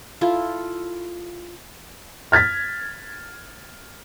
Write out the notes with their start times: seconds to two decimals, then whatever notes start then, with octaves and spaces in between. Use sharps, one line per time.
0.21 E4 F4 A4
2.32 F6 G#6 A6 B6